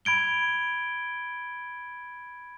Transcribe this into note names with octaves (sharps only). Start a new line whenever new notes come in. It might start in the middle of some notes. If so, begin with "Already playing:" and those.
B5 G#6 D7 G7